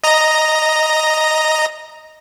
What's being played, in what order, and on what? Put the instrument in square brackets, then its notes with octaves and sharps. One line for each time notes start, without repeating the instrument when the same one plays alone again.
[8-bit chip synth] D#5 A#5 A#6